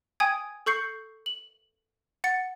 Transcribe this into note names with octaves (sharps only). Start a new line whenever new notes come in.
G5 G#5 D#6 G#6
A4 C#6 G6 C7 C#7
F#7
F#5 A6 C#7